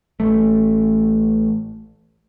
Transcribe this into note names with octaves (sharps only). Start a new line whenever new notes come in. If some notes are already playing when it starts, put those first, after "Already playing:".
A1 A3